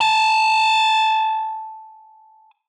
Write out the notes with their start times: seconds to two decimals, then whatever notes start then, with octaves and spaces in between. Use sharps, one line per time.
0.01 G#5 A5